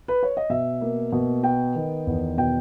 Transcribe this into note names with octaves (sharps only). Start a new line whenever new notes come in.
B4
C#5
D#5
B2 E5
A#3
B2
B3 G5
D#3
E2
B2 G5